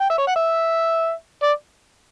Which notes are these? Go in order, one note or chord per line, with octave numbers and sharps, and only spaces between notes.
G5
E5
C#5
F#5
E5
D5